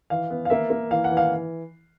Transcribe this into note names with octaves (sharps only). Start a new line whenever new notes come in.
E3 F5
B3
F5
A#3 E5
A#3
E3 F5
F#5
E3
F5